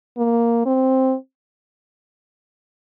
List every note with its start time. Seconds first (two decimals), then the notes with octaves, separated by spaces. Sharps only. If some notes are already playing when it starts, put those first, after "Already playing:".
0.17 A#3
0.66 C4